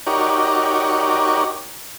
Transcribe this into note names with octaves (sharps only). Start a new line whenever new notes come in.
D#4 F#4 G4 A#4 C#5 D5